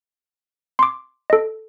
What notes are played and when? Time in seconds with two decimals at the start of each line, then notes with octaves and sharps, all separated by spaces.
0.79 C6 D6
1.30 A4 D#5